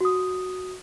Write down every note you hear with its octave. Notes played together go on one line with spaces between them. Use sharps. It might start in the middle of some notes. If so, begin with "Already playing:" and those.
F#4 D#6